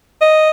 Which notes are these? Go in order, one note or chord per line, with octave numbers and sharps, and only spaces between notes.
D#5